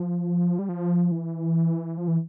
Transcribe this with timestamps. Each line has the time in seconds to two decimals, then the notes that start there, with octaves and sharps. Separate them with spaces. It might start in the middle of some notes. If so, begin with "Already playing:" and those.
Already playing: F3
0.59 G3
0.69 F3
1.12 E3
1.98 F3
2.08 E3